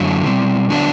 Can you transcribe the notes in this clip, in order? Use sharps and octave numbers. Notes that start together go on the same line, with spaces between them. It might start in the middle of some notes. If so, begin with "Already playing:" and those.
Already playing: F#2 D3 F#3 A3
B2 G3 C4
D3 F#3 B3 D4